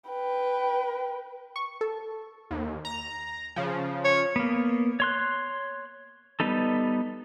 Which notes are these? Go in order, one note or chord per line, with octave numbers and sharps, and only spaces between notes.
B4 G5
C#6
A4
D#2
A#5
C#3 F3
C#5
A#3 B3
C#5 C6 F#6
G3 B3 D#4 A4